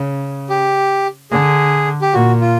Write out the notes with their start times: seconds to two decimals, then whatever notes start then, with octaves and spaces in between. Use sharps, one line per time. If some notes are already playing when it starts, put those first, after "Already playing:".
Already playing: C#3
0.50 G4
1.31 D3 G#4
2.02 G4
2.13 A#2 F#4
2.41 F4